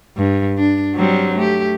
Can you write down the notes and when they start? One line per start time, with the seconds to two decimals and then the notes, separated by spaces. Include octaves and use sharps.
0.17 G2
0.58 D4
0.96 F#3 G3 C4
1.36 A3 G4